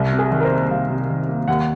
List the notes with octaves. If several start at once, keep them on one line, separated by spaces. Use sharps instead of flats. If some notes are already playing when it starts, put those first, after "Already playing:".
Already playing: C2
C3
G#4
D#3
A#4
C5
A#3
C2 F5
C3
D#3
A#3
D#2 F#5